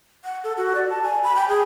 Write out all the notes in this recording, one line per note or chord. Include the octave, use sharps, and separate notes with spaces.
F#5
A4
F#4
D5
A5
G#5
B5
G5
G#4